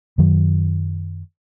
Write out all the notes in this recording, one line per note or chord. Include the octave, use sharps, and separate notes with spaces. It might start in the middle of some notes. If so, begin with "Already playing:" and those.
F#2 D#3 F#3